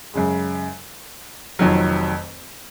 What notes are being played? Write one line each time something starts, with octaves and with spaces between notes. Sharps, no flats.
F#2 C#3 G#3
F1 F2 D#3 F#3